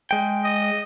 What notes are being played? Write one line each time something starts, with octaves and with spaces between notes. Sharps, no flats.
G#3 G5
D#5